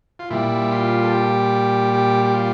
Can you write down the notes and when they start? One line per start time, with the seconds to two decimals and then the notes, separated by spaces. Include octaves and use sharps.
0.19 F4
0.30 A#2 G3 E4
0.71 F4
1.04 A4
1.12 G4
1.93 G4
2.25 G4
2.34 F4